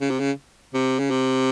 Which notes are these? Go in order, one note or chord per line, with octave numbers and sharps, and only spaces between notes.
C#3
C3
C#3
C3
C#3
C3